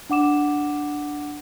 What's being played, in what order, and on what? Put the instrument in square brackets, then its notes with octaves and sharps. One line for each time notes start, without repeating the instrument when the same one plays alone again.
[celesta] D4 F#5 D6 E7